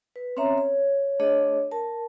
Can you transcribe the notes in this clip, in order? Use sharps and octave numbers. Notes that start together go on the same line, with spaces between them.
B4
C4 C#4 C#5 E5 A#5
C#5
A3 D4 G#4 C#5 D#5
A#4 A5